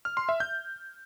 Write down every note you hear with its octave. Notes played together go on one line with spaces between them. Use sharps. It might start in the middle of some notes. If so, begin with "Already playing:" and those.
F6
C6
E5
G6